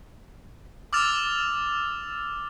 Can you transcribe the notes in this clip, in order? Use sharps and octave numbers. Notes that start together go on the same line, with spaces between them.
D6 E6 F6 A6 F7